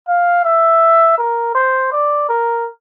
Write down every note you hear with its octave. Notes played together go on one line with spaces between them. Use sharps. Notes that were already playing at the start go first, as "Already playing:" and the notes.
F5
E5
A#4
C5
D5
A#4